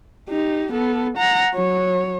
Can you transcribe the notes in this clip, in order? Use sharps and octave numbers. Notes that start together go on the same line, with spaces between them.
D#4 G4
B3 A4
F#5 A#5
F#3 C#5